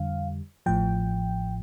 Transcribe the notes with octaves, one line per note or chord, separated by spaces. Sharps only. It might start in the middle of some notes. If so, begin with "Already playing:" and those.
Already playing: F2 D3 G3 F5
A1 A2 F3 G5